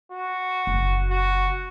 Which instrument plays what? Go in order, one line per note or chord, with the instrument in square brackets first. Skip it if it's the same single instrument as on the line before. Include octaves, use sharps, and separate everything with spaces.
[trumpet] F#4
[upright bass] F#1
[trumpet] F#4